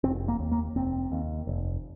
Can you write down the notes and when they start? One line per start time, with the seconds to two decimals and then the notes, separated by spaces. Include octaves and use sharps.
0.04 F1 C4
0.28 A#3
0.39 D#2
0.52 A#3
0.76 F1 C4
1.12 D#2
1.47 F1